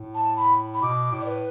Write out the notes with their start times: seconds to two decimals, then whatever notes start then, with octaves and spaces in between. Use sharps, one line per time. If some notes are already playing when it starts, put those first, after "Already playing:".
Already playing: A2
0.14 A5
0.37 B5
0.74 B5
0.82 B2 D6
1.12 A2
1.21 D5
1.26 B4